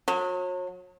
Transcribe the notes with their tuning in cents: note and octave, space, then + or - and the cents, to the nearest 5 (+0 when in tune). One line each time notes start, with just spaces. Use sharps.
F#3 -35